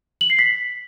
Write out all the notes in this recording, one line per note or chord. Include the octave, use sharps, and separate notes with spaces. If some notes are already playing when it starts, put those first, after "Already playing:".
F#7
C7
B6